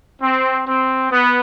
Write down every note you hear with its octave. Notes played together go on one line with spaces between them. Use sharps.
C4
C4
B3